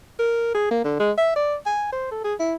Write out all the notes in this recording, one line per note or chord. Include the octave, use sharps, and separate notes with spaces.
A#4
G#4
A#3
D3
G#3
E5
D5
G#5
C5
A4
G#4
E4